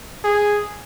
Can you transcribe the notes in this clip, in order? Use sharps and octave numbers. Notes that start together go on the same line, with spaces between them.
G#4